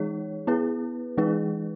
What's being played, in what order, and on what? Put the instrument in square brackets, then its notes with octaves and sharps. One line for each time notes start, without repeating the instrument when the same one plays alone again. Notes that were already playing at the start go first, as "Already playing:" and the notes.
Already playing: [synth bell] E3 G#3 D#4 G#4 C#5
B3 E4 G#4 B4
E3 G#3 D#4 G#4 B4